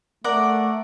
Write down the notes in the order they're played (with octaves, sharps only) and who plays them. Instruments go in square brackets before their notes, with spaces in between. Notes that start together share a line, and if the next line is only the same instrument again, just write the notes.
[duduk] A3 [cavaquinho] A#4 D5 F#5